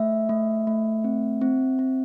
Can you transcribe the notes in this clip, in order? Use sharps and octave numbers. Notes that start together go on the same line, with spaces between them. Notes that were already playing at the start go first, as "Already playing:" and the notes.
Already playing: A3 E5
A3
A3
C4
C4
C4